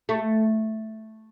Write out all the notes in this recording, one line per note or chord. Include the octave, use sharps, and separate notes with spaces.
A3